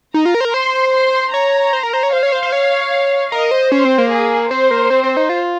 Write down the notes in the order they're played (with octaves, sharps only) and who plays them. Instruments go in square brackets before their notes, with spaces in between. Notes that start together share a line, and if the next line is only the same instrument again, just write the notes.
[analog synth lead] D#4 [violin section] A#5
[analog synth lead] F4
A#4
C5
A#4
[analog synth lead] C5 [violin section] C6
[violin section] C6
[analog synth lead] C#5 [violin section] A#5
[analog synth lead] C5
A#4
C5
C#5
[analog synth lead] C5 [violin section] F5
[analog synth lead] C#5
C5
C5
C#5
[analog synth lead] A#4 [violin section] D#5
[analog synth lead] C5
[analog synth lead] C#4 [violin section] C5
[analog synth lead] C4
A#3
[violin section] G#4
[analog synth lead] C4 [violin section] C5
[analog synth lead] A#3
C4
C4
D#4
F4